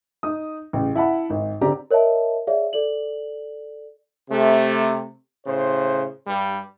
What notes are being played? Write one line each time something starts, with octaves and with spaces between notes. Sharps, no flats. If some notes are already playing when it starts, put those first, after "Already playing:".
D#4 D#6
A1 C#3
E4 F#5 A5 B5
G#1
D3 C4 G4 D5 A#5
A#4 C#5 D#5 E5 A5
G#4 C#5 D5 E5 F5
A4 D5 F#7
C3 A3
A2 C#3 C5
G2 G3